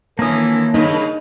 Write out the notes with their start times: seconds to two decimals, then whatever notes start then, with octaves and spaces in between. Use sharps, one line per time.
0.19 F2 D#3 E3 A#3 C#4 D4 D#6
0.74 G2 C#3 D#4